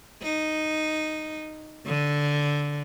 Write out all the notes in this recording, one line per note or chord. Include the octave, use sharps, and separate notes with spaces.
D#4
D3